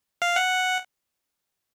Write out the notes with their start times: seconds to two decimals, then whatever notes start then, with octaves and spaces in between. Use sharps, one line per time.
0.22 F5
0.36 F#5